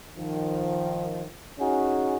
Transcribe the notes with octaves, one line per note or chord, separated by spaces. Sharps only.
D#3 F3
C#4 D#4 F#4 G#4